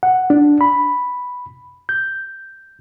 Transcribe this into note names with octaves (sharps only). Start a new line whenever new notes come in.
F#5
D4
B5
G6